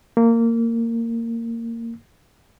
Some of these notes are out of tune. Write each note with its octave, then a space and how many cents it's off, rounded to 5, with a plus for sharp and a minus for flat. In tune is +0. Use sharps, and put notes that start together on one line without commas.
A#3 -20